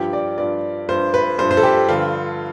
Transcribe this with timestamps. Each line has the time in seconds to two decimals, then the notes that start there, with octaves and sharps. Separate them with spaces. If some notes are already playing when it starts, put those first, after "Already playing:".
Already playing: G2 F3 G4
0.13 D5
0.38 G2 F3 D5
0.89 G2 F3 C5
1.14 B4
1.38 G2 C5
1.42 F3
1.51 C5
1.57 A4
1.63 G4
1.89 G2 D3 F3 F4